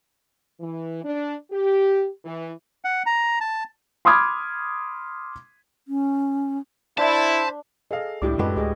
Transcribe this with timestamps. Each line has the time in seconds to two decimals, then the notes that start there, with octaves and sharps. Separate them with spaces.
0.60 E3
1.04 D4
1.51 G4
2.25 E3
2.85 F#5
3.06 A#5
3.41 A5
4.05 B5 C6 D6 D#6 F6 G#6
5.88 C#4
6.98 D4 E4 C5 A5 B5
7.91 G#4 A4 D#5 F5
8.22 C#2 A2 D4 E4 G4 D6
8.39 F#2 G#3 F#4 G4 A4 B4 D#5
8.56 D2 G#4 D#5 D6